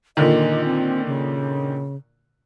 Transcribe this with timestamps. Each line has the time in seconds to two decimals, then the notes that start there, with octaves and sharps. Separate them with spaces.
0.17 A#2 D3 D#3 D#5
0.65 C4
1.06 C#3